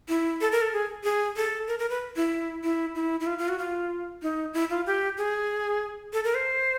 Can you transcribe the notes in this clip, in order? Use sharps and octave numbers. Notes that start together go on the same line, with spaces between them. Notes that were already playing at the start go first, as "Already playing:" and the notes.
E4
A4
A#4
A4
G#4
G#4
A4
A#4
A#4
B4
E4
E4
E4
E4
F4
F4
F#4
F4
D#4
E4
F4
G4
G#4
A4
A#4
C5